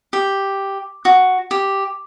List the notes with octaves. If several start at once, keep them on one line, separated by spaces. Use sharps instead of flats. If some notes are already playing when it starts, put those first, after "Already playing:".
G4
F#4
G4